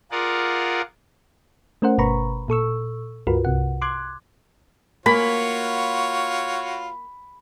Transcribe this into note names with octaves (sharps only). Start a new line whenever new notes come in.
F4 G#4 A#4 D5 F#5
A3 C#4 A#4 C5 F#5
G1 B2 B4 A#5 B5 C#6
A#2 A4 C#6 E6
C#2 G2 F4 F#4 A#4 B4
C2 C3 F#5
C6 D6 F#6 G#6
A#3 F4 F#4 C#5 B5